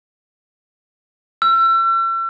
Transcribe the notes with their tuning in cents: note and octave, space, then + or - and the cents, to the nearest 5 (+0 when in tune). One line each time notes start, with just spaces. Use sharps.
E6 +40